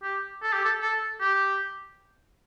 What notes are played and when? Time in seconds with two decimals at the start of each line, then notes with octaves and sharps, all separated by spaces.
0.03 G4
0.43 A4
0.53 G4
0.65 A4
0.81 A4
1.20 G4